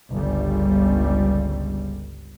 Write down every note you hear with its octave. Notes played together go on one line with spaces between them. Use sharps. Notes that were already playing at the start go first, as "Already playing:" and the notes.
G1 C#2 G3